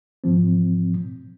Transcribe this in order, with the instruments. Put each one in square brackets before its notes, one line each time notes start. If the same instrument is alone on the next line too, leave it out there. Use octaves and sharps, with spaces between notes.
[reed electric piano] G#2 E3 F3 C4